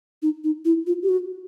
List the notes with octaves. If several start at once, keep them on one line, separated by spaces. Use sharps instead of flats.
D#4
D#4
E4
F4
G4
F#4